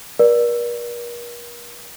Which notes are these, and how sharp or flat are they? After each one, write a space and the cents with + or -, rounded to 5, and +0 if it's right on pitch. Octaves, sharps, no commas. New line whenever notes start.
A#4 +45 D5 +10